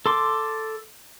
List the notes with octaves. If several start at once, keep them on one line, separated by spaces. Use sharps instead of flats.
A4 C6 D6